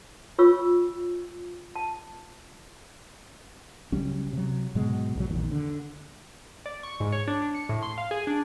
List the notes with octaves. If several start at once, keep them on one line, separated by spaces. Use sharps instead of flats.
F4 C#5 B5 C#6 E6
A5
C#2 F#3 G3 C#4
C3 F#3
G#2 B2 F#3 G#3
B1 D3 F#3
A#1 E2 A#2 D#3
D3
D5
C#6
G#2
C#5
D4
D4
C#7
A2
C6
F5
G#4
D4